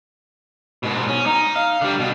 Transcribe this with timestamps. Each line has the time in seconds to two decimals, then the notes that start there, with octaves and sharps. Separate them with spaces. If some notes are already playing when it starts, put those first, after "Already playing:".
0.83 G#2 B2
1.08 C#4
1.26 D#4
1.55 F5
1.81 D3 G3
2.00 B2